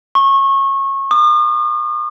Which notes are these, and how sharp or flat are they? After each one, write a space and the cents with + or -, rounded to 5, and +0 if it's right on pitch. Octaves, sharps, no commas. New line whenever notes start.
C#6 -25
D#6 -45